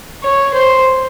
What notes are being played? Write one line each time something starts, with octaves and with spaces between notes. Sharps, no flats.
C#5
C5